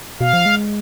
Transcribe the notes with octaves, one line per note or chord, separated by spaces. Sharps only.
B2 F5
F3
G#3